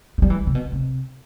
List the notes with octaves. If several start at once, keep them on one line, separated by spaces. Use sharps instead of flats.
A3
G3
E3
C3
B2
C3